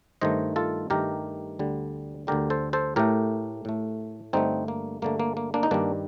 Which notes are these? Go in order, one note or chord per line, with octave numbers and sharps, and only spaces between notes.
G2 D#3 A3 C5 D#5
F4 A4
G2 D#3 A3 G4 A#4
D2 D3 G3
D2 D3 G3 G4 A#4
A4 C5
A4 C5
A2 A3 G4 A#4
A2 A3
G2 D3 A3 C4 D#4
A#3
G2 D3 A3 A#3
A#3
A#3
A#3 D4
D#4
G2 D#3 G3 A#3 D4